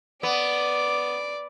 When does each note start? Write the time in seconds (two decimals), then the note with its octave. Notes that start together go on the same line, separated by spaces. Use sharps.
0.23 B3 D5 D6